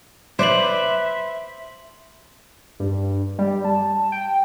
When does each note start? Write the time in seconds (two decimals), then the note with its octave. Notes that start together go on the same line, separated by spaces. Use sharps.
0.39 B4 C5 D5 E5 C6 F#7
2.80 G2
3.39 G3
3.65 A5
4.12 G5